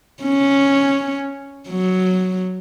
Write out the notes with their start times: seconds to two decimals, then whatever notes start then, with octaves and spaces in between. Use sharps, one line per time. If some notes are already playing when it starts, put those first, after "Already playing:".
0.24 C#4
1.69 F#3